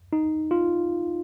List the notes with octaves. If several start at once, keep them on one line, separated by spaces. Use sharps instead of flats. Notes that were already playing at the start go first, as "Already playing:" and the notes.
D#4
F4